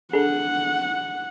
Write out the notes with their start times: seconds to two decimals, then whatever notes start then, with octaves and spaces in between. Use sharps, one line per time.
0.13 D4 G#4 A4 F#5